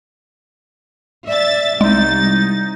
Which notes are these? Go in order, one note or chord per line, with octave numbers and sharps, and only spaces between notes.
D5 E5 A6
C2 G#3 D#4 A6